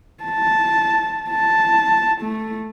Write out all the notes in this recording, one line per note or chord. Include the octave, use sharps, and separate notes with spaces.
A5
A5
A3